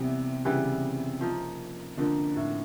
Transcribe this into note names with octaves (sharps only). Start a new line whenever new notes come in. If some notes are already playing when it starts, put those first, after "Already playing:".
Already playing: C3 E3 G3 B3
C#3 E3 G3 B3
F3 A#3 D#4
D3 F3 A#3 D#4
A2